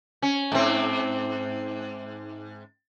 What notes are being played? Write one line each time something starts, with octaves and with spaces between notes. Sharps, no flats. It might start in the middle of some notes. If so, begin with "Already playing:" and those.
C#4
G#2 C4